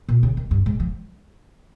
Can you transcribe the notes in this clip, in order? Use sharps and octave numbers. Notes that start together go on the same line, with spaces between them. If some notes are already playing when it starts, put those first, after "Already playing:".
A#2
C#3
D#3
G2
G#2
F3